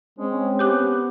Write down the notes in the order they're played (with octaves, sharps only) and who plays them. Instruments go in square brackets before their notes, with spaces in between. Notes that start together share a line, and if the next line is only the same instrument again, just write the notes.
[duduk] G#3 [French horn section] C4 C#4
[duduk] B3 [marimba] G4 D6 F#6